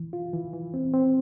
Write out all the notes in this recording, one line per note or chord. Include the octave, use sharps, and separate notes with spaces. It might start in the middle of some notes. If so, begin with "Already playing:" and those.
Already playing: E3
F4
E3
E3
C4
C4